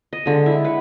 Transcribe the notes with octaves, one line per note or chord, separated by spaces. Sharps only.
D#5
D3 G#3
E4
B4 F#5